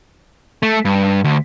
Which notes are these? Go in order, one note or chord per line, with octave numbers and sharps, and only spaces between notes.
A3
G2
D2